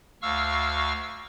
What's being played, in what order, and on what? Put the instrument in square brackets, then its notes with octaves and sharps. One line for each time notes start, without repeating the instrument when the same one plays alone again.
[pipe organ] D2 F5 C#6 E6 F6